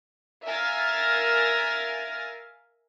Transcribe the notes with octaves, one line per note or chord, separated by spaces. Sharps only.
A#4 E5 F5 G#5 A6